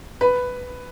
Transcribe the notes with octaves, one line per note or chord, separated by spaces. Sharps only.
B4